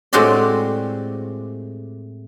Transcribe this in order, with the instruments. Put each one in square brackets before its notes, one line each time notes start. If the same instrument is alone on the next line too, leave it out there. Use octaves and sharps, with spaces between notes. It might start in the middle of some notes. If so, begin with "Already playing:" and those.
[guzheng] A2 G#3 C4 F#4 G4 D5